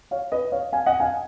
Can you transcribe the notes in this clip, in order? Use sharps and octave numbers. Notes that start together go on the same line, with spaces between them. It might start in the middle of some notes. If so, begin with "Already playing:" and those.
C#5 F5
B4 D#5
C#5 F5
F5 G#5
D#5 F#5
F5 G#5